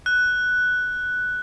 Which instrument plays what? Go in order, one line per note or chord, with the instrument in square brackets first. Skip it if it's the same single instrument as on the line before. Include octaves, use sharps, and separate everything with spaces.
[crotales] F#6